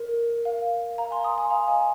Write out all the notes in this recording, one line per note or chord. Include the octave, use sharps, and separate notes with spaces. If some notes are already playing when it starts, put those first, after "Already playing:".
Already playing: A#4
F5
F5 A#5
G#5 C6
A#5 D#6
G#5 C6
F5 A#5
D#5 G#5